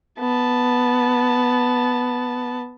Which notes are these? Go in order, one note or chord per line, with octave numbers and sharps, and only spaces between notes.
B3 A5